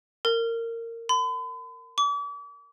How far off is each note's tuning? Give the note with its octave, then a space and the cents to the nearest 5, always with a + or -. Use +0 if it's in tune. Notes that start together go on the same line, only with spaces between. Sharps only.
A#4 -20
B5 +45
D6 -40